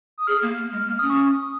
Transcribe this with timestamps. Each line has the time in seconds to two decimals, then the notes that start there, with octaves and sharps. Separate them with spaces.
0.18 D#6
0.27 G#4 F6
0.42 A#3
0.58 A#3
0.72 G#3
0.87 A#3 F6
0.99 C#4 D#6
1.10 C#6
1.21 D#6